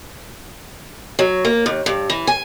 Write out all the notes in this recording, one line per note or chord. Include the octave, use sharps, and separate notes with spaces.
F#3
A#3
D#2
G2
E3
G#5